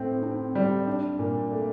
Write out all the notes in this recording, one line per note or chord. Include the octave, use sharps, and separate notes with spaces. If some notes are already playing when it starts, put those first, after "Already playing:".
Already playing: A2 C4
C4
G3
D4
A#2
A3